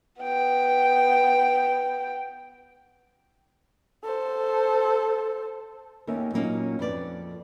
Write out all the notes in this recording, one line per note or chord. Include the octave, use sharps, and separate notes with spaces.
B3 G5
A4 C5
D#2 D#3 A#3 C#4 E5
A#2 F#3 A#3 C#4 D#4
F2 B4 D5